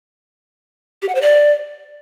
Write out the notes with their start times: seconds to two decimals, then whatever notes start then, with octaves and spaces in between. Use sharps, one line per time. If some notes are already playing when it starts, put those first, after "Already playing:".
1.02 G4
1.09 F#5
1.15 C5
1.21 D5